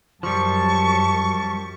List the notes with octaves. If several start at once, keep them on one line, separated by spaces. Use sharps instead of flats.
F#2 F3 G3 A5 C#6